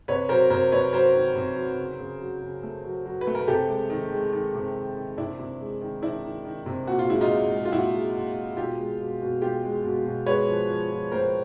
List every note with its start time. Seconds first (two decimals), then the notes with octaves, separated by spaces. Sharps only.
0.08 C3 B4 C#5
0.29 F#3 A#4 C5
0.50 C3 A#4 C5
0.72 C3 B4 C#5
0.93 F#3 A#4 C5
1.15 D#3
1.36 C3
1.57 F#3
1.78 C#3
2.00 C#3
2.21 F#3
2.41 C#3
2.63 A3
2.84 F#3
3.06 F#3
3.21 B4
3.27 A3
3.35 A#4
3.48 C3 G4 A4
3.69 G#3
3.90 D#3
4.12 G#3
4.32 D#3
4.55 C3
4.76 D#3
4.96 D#3
5.18 C3 D4 E4
5.39 C3
5.60 G#3
5.81 D#3
6.02 D#3 D4 E4
6.24 D#3
6.45 D#3
6.66 C3
6.87 A#2 F#4
6.99 F4
7.09 G#3 E4
7.21 D#4 F4
7.30 G#3
7.52 G#3
7.65 F4
7.72 A#2 E4 F#4
7.93 G#3
8.15 A#2
8.36 G#3
8.57 B2 F4 G4
8.79 G#3
9.00 B2
9.21 B2
9.42 G#3 F4 G4
9.64 G#3
9.85 B2
10.05 B2
10.26 G#3 B4 C#5
10.48 F3
10.69 F3
10.91 F3
11.12 A2 A#4 C5